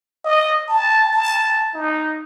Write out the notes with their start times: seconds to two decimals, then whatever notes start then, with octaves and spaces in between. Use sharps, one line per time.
0.25 D#5
0.68 A5
1.13 A5
1.74 D#4